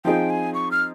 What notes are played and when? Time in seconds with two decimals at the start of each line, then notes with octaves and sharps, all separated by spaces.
0.05 F3 C4 D#4 G#4 G5
0.30 G#5
0.54 C#6
0.71 F6